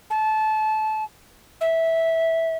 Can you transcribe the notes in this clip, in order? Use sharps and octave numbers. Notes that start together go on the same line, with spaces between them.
A5
E5